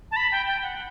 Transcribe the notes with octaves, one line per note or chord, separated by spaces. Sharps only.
A5
B5
G5
G5
F#5